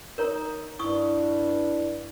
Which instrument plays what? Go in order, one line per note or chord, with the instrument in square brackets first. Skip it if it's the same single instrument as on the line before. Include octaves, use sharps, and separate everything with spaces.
[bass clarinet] D#4 [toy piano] A#4 C#5 A#5
[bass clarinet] G2 [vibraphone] E4 D5 [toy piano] C#6 D#6